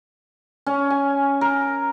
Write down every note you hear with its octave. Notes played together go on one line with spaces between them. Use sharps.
C#4
G#5
A#4